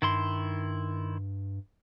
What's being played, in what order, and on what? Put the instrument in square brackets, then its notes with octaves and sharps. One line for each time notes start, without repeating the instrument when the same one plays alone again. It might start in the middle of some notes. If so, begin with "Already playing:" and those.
[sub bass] G2 [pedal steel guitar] D#3 E4 C6